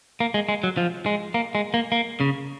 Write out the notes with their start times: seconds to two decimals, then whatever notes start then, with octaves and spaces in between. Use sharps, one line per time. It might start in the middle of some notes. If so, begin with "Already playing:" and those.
0.20 A#3
0.34 G#3
0.49 G#3
0.64 F#3
0.77 F3
1.06 G#3
1.34 A#3
1.55 G#3
1.74 A#3
1.92 A#3
2.20 C#3